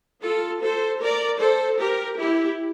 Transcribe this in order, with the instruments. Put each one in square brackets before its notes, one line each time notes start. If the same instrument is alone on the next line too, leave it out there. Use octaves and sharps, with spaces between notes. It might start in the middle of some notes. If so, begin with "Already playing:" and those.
[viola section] F4 A4
A4 C5
A#4 D5
A4 C5
G4 A#4
E4 G4